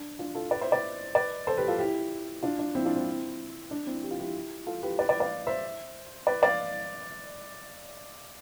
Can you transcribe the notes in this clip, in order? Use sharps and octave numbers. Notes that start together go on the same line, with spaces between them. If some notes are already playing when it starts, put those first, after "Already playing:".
Already playing: D4
D4 F4
F4 A4
B4 D5
C5 E5
B4 D5
B4 D5
A4 C5
G4 B4
F4 A4
E4 G4
D4 F4
D4
C4 E4
D4 F4
C4 E4
D4
C4 E4
G4
F4
E4 G4
F4 A4
G4 B4
B4 D5
B4 D5
D5 F5
C5 E5
B4 D5
D5 F5